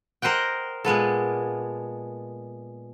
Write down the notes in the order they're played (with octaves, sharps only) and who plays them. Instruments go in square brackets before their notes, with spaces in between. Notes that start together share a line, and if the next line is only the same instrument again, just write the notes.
[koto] A#4 C5 D#5 F#5 G5
A#2 G#3 B3 A4